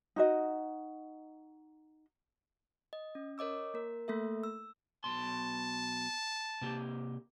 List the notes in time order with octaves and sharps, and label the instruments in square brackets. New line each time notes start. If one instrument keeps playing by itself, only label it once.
[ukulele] D#4 F#4 D#5
[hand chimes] D#5
C#4
A#4 C#5 D#5 D6 E6
A#3 A#4
A3 A#3 A4 E5
E6
[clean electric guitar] B1 B2 C6 [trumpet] A5
[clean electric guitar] C3 A#3 G4